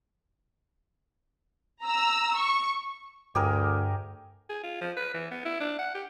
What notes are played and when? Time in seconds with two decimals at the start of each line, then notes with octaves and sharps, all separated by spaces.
1.85 A#5 E6
2.39 C#6
3.35 D2 G2 G4 G#4 A#4
4.49 G#4
4.63 F4
4.81 F3
4.97 B4
5.14 E3
5.31 B3
5.45 E4
5.60 D4
5.79 F#5
5.95 G4